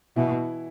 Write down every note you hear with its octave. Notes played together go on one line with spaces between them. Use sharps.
B2 E3 E4